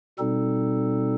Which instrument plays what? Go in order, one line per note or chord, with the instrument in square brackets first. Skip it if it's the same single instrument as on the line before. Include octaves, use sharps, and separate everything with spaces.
[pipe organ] B2 G3 C4 D#4 A4